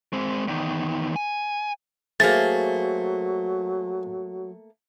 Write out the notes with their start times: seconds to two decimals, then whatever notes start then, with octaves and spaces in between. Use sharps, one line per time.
0.13 G#3 C4
0.47 E2 D#3
1.16 G#5
2.20 F#3 A3 A#3 G#4 C5 A6